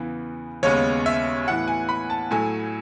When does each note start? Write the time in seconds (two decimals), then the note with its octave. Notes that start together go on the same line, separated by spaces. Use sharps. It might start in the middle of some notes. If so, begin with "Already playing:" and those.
Already playing: E2 C#3 E3 B3
0.63 D#2 C#3 G#3 B3 C#5
1.06 E5
1.48 A2 E3 B3 F#5
1.68 G#5
1.89 B5
2.10 A5
2.31 A2 F#3 A3 G#5